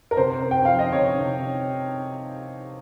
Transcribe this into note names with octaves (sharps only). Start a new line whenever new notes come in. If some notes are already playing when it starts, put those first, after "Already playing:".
A#4
C3 C5
C4
G5
F3 F5
D#5
C3 C#5
C3